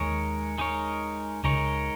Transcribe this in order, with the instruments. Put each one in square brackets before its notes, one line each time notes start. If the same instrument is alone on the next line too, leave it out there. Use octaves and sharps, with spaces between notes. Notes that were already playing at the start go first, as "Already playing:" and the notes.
Already playing: [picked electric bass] D#2 D#3 [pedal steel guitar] G#3 D#4 A#4 C#5
[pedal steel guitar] G#3 D#4 A#4 C#5
[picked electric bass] C#2 C#3 [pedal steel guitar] G#3 D#4 A#4 C#5